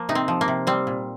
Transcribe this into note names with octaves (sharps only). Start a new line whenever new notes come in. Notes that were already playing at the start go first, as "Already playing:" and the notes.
Already playing: F3 A#3
C3 D#4
C4
F3
A#3
C3
G3 C4
A#2